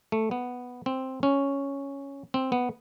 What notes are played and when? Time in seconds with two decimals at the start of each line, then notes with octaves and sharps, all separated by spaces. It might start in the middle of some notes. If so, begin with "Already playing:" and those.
0.12 A3
0.31 B3
0.86 C4
1.23 C#4
2.34 C4
2.52 B3